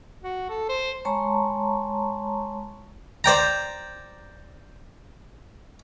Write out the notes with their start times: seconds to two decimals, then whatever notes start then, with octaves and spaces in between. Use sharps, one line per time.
0.23 F#4
0.49 A4
0.69 C5
1.05 G#3 C#5 A5 A#5 C6 C#6
3.24 C5 D5 G5 A#5